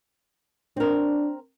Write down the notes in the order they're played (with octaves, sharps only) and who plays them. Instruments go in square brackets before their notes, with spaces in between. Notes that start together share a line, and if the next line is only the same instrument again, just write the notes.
[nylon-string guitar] C4 A#4 [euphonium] D4